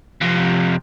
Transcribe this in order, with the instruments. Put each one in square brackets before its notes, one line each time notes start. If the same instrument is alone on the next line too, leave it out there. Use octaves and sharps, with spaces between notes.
[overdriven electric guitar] F2 C3